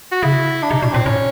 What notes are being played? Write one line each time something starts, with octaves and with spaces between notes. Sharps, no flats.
F#4
C#3 E4
D4
C3 D#4
B2 D4
A#2 C4
A2 C#4